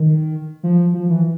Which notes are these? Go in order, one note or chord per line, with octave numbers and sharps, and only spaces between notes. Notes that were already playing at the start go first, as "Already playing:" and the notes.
Already playing: D#3
F3
F3
E3